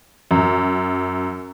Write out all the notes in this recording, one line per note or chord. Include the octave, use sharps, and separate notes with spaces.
F#2